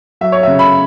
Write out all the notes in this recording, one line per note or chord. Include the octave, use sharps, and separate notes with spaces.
F#3 E5
C#5
E5
C#3
B5